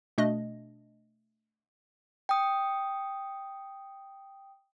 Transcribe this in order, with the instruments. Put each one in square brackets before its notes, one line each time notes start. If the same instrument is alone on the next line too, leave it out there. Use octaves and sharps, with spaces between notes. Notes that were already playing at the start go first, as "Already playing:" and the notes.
[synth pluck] B2 A3 D4 D#5
[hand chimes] G5 D#6